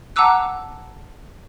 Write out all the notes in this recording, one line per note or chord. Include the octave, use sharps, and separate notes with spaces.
F#5 A5 A#5 D6 E6 F#6